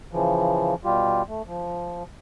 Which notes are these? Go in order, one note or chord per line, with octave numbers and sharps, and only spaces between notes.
C#3 E3 F3
B2 G3 F4 G4
A3
F3